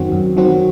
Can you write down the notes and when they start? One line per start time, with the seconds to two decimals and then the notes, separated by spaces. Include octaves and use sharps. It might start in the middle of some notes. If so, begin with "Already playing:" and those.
Already playing: F#2 D#3 F#3 C4 F#4
0.12 F#2
0.37 D#3 F#3 C4 F#4